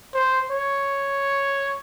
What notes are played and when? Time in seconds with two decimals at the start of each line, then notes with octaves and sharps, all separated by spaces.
0.14 C5
0.51 C#5